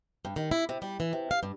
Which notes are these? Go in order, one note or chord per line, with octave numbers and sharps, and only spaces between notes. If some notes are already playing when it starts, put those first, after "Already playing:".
G2
D#3
E4
C3
G3
E3
C3
F5
G2